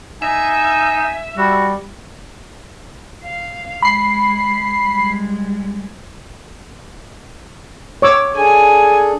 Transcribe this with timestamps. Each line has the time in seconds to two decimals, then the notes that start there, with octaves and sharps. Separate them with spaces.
0.22 D#4 E5 G#5
1.38 G3 F#4
3.24 F5
3.82 G#3 B5 C7
4.85 G3 G#3
8.02 C#5 D6 E6
8.36 D4 G#4 A4 G#5